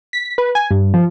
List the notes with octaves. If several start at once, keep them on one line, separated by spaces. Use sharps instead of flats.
B6
B4
G#5
G2
F3